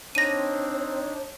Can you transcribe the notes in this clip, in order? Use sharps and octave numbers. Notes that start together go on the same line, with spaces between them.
C4 D4 D#4 C#5 A#6 D#7